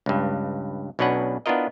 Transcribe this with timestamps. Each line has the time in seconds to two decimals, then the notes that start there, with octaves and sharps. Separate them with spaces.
0.06 C#2 G2
0.99 B1 B2 C#4 D4 B4 F#5
1.46 B3 D4 E4 F4 A#4 D#5